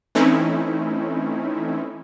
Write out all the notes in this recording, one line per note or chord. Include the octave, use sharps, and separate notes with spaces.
E3 A3 C4 C#4 D#4 E4